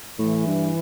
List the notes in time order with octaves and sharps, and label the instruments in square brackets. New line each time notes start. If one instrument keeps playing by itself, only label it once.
[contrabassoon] A2 [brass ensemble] E3
[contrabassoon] G2